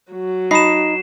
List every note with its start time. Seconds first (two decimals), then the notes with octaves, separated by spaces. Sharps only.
0.12 F#3
0.51 D#4 D#5 A5 B5 C7 E7